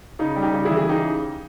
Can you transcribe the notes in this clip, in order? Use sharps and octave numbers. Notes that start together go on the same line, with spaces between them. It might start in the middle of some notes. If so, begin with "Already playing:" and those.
C#3 D#4
G3
D#4 G4
C#3
E4 G#4
E3
G#4
C#3 D#4 G4